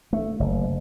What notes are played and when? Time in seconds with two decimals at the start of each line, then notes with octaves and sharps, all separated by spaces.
0.13 A3
0.40 F#1